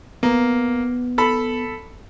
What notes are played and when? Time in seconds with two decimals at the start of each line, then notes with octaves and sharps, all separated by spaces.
0.23 A#3 B3
1.18 A4 B5